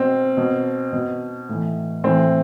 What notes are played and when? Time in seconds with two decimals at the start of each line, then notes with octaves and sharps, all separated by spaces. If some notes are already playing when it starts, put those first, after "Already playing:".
Already playing: B2 C4
0.37 B2
0.92 B2
1.49 A2 E3
2.04 A2 E3 C4